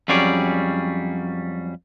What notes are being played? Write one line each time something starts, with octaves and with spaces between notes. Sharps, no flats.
F2 F#3 G3 C#4 G#4 D5